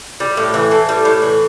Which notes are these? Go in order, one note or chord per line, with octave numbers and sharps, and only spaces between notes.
G3
A2
E3
A2
G3
A2
E3